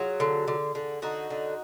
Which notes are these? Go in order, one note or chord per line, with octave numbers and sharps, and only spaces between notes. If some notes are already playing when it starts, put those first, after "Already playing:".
Already playing: F#3 F4 G#4
D3
D3
D3
D3 D#4 F#4
D3